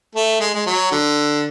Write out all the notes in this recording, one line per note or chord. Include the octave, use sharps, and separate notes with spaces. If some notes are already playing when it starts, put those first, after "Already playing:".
A3
G#3
G#3
F#3
D3